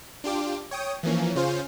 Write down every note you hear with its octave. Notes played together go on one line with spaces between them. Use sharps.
D4 F4 G4 D6
C#5 G5 D#6
E3 F3 A#3 C#4
C#3 C#4 F4 C5